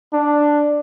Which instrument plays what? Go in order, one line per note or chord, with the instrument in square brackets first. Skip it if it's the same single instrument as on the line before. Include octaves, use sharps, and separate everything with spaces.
[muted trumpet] D4